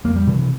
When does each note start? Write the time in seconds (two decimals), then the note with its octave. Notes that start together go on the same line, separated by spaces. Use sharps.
0.04 F2 A#3
0.16 G3
0.27 C3 E3
0.39 E3